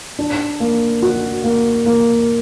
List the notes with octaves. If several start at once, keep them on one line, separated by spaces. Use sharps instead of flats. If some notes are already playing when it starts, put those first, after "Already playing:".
D4
A#3
F#4
A#3
A#3